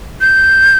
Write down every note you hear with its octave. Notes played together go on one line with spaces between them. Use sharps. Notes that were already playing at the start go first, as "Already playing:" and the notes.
G6